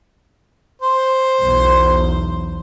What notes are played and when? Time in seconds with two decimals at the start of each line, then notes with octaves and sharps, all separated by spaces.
0.82 C5
1.41 B1 E2